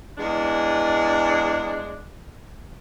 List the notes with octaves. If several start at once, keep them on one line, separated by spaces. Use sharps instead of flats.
E2 G#3 D4 G#4